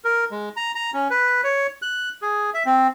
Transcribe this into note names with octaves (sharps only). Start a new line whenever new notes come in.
A#4
G#3
A#5
A#5
C#4
B4
C#5
F#6
G#4
E5
C4